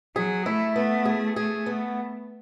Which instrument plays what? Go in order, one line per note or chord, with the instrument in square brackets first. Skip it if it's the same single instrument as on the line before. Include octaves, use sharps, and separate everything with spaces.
[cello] F#3 [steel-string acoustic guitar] G#4
[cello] A3 [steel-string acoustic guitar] E4
[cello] A3 [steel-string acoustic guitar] B3
[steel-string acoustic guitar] G#4
[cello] A3 [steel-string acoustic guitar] G#4
[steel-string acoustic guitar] B3